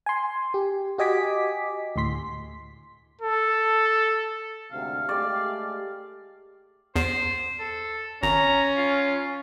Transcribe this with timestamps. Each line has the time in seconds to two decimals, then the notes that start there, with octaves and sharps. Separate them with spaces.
0.06 G#5 C6
0.54 G4
0.98 F#4 G4 D#5 G#5 D6 B6
1.96 D2 A2 C6 B6
3.21 A4
4.72 D2 G#2 C3 F5
5.09 G#3 A3 G4 D5
6.96 E2 C5
7.60 A4
8.23 G#1 C#4 A#5
8.77 F4